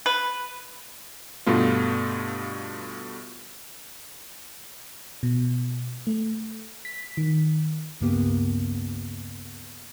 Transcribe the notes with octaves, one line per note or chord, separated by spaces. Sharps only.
B4
G2 B2 A3 F4
B2
A3
B6
D#3
C#2 G2 C#3 A#3 B3 G4